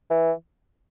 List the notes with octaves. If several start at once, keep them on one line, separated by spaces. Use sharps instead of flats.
E3